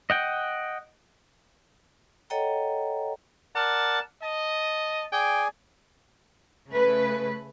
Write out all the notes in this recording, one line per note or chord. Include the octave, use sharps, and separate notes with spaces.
D#5 F#5 G5
A4 C#5 D#5 F#5 G5 A#5
A#4 D5 F#5 A5
D#5 A5
G#4 D5 G5 G#5
C#3 A3 B4